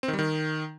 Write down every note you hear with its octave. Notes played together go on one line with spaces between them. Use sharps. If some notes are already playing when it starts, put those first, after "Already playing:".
C4
D#3
G3
D#3